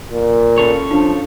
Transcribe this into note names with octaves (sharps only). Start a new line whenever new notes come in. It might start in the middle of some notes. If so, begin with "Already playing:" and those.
A#2
C#4 A4 C#5
F3 D4